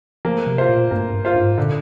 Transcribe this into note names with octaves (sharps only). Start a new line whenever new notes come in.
F3 A#3
C3
F4 C5
A#2
G2 A#3
G2
F4 C5
G#2
A#2 D3